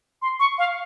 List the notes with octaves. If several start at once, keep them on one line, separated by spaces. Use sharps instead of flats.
C6
C#6
F5